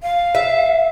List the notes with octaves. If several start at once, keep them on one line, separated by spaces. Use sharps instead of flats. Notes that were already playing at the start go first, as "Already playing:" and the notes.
F5
E5